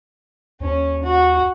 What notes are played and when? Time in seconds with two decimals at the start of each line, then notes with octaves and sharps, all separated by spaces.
0.60 D#2 C#4
1.03 F#4